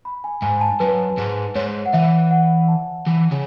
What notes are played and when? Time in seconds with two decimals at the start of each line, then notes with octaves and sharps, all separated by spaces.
0.05 B5
0.24 G#5
0.42 G#2 G#5
0.61 A5
0.80 F#2 B4
1.17 G#2
1.55 G#2 C#5
1.86 F#5
1.93 E3 E5
2.31 F#5
2.68 A5
3.06 E3
3.31 C#3